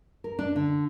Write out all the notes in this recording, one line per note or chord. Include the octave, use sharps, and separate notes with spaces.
A#4
D4
D3